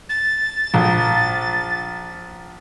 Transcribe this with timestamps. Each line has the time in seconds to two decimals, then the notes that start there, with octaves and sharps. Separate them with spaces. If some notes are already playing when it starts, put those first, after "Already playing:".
0.09 A6
0.74 A#1